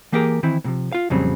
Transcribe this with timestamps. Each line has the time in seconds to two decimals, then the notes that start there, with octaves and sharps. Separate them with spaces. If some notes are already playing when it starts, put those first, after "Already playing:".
0.12 E3 A#3 G4 G#4 A#4 G5
0.43 D#3 E3 C4 E4
0.64 A2 C3 F3
0.92 F4 F5
1.10 F2 A#2 C#3 F#3 G3 C4